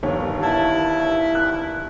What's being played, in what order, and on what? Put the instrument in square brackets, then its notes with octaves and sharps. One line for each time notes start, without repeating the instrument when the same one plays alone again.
[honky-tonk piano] G1 D#2 C#5
[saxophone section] E4 [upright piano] A5
[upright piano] F#6